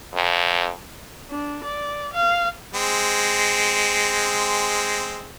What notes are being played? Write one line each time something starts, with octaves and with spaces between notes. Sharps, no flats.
F2
D4
D5
F5
G#3 C4